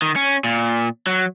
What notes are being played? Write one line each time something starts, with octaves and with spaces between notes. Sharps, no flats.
D#3
C#4
A#2
F#3